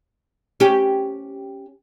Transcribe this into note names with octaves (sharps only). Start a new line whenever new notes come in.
C#4 G4